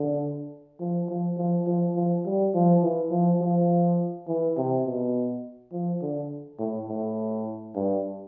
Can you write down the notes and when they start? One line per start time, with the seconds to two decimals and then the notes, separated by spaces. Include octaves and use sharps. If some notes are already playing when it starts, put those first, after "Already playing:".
Already playing: D3
0.80 F3
1.09 F3
1.37 F3
1.67 F3
1.95 F3
2.25 G3
2.54 F3
2.82 E3
3.11 F3
3.41 F3
4.28 E3
4.57 C3
4.86 B2
5.72 F3
6.02 D3
6.59 A2
6.88 A2
7.75 G2